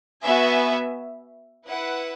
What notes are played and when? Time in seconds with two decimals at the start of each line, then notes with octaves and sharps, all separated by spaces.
0.22 B3 F#4 B4 E5 G#5
1.66 E4 B4 F#5